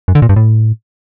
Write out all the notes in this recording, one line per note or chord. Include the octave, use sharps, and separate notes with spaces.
F#2
D3
A#2
G2
A2